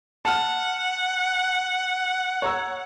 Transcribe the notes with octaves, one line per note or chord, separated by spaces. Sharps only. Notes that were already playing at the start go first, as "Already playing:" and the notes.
F#5 A5 F6
C#5 A#5 E6